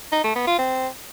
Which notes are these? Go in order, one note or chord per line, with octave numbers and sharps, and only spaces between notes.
D#4
A3
B3
F4
C4